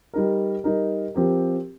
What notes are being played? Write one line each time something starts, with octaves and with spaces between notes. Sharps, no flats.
G3 D#4 A#4
G3 D#4 A#4
F3 C4 G4 A#4